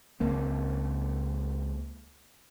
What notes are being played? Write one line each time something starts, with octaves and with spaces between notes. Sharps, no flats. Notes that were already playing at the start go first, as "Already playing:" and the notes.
C#2 A#3 C4